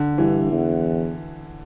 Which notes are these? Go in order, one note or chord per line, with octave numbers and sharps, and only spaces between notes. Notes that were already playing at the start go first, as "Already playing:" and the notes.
Already playing: D3
G2 E3
E2